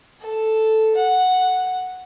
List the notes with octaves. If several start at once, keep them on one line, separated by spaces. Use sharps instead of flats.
A4
F#5